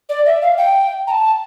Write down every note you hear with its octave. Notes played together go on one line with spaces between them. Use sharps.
D5
E5
F5
G5
A#5
A5